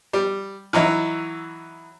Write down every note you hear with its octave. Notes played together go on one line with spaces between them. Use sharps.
G3
E3 F#3 D#4 E4